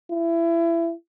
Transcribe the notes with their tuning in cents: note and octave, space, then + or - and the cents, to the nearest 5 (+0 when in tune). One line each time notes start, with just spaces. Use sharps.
E4 +25